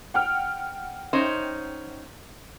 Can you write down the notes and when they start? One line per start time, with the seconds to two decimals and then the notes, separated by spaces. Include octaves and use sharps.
0.14 F#5 G5 F6
1.13 C#4 D#4 C5